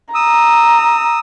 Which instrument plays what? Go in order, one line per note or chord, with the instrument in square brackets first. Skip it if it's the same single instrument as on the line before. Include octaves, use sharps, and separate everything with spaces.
[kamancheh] A#5 [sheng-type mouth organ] D#6 E6